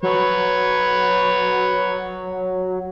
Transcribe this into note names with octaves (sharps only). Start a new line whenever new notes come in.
F#3 B4 C#5